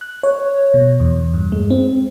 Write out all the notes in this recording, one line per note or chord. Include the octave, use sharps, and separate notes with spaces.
F#6
C#5
B2
E2
G2
G#3
C4